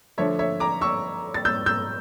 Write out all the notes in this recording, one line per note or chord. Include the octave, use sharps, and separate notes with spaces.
D3 F3 A3 D4 C#5 E5
C#5 E5
A#5 D6
C#6 E6
A6
E6 G6
E6 G6